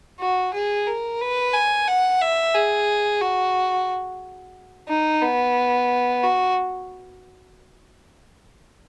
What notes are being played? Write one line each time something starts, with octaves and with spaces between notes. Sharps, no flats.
F#4
G#4
A#4
B4
G#5
F#5
E5
G#4
F#4
D#4
B3
F#4